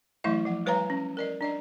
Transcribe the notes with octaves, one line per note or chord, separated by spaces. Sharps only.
E3 F#3 A3 E4 D#5 E5
F3 F#5
G3 B4 C#5 F5 G#5 A#5
C#4
A#4 D5 D#5
D4 D5 D#5